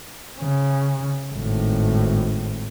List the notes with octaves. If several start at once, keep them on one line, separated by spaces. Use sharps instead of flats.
C#3
G#1 A2